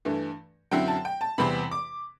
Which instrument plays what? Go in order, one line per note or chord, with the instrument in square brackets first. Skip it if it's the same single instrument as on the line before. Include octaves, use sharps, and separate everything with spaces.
[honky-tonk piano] G2 E3 A3
F#2 D3 F#3 C4 E4 G5
A5
G5
A5
E2 C3 E3 G3 C4 B5
D6